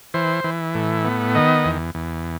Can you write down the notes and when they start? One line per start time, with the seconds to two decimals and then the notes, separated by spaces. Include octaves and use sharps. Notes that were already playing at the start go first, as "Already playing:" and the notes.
0.14 E3 C5
0.44 E3
0.75 A2
1.05 B3
1.35 D#3 D#5
1.65 E2
1.95 E2